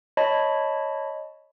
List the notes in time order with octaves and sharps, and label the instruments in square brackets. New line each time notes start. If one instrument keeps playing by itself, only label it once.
[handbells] C#5 D#5 A5 B5